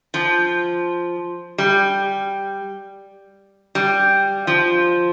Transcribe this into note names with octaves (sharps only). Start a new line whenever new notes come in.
F3
G3
G3
F3